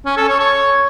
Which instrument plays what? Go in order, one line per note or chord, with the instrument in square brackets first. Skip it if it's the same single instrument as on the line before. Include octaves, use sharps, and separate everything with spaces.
[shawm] C#4
A4
C#5
C#5